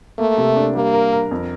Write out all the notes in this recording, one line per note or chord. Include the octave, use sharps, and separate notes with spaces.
A3 A#3
C3
D4
G3 A#3
A#4
A#4
F2